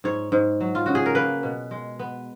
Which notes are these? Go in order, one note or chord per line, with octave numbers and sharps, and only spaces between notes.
G#2 C#5
G#2
F#3
F4
C#3 F#4
G#4
A#4
A#3 B4
B2
G#3
B3